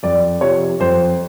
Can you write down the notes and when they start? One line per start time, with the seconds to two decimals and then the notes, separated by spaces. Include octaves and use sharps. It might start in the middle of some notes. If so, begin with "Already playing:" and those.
0.03 F2 D5
0.41 C3 F3 C#5
0.80 F2 C5